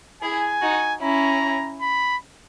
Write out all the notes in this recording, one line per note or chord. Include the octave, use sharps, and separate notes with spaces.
E4 G#4 G#5
D#4 F#4
C#4 E4 A#5
B5